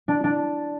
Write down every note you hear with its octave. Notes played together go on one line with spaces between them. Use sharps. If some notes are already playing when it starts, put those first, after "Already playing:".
D4
D4